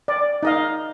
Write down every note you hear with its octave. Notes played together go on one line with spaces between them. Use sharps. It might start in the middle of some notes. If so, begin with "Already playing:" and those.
D5
D#4 D#5 F5